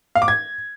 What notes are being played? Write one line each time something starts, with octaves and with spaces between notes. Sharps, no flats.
F5
D6
G#6